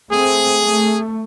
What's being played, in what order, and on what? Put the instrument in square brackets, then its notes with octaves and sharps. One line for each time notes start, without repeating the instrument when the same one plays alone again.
[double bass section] A3 C4 [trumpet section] G#4
[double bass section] A3